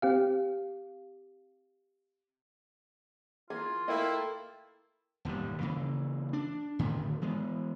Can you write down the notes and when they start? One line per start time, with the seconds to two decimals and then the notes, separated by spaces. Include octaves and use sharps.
0.02 C4 G4 F5
3.50 E3 A#3 F4 G#4
3.88 A3 A#3 E4 A4 A#4 D#5 G5
5.25 E1 D#2 G#2 G3
5.61 C#3 E3 A#3
6.33 D4
6.79 A2 D3 D#3 A3
7.22 E3 G#3 B3